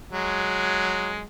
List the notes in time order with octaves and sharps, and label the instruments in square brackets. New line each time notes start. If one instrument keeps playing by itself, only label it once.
[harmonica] F#3 G#3